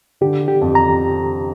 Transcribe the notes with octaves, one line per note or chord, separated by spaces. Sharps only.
D3 G4
G4
F2
A#5